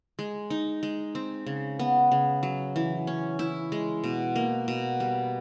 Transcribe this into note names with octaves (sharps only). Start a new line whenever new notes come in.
G#3
D#4
G#3
C4
C#3
B3
C#3
F#3
E3
C#4
E4
G#3
B2
A#3
B2
G3